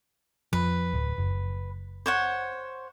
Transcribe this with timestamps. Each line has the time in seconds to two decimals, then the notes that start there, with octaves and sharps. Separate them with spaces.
0.53 F2 F3 B4
0.93 D1
1.18 F#1
2.06 C5 C#5 F#5